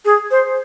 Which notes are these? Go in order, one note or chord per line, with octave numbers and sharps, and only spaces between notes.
G#4
C5